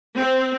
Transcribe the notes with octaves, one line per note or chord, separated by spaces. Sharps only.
C4